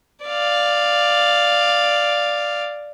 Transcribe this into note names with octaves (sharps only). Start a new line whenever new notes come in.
D5 F5